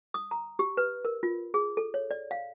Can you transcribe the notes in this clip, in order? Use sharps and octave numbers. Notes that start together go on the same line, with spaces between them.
D#6
A#5
G4
B4
A#4
F4
G#4
A4
C#5
D5
F5